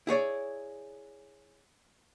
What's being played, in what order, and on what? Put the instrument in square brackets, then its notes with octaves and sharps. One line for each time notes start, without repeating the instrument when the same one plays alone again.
[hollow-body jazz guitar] E4 G#4 C#5 D5